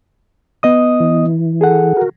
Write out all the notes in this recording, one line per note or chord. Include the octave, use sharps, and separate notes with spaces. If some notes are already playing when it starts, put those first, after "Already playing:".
B3 D#5 D#6
E3
G#4 A4 F#5
F#4 A#4